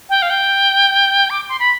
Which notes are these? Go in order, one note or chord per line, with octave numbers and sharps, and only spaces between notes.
G5
F5
G5
D6
C6
B5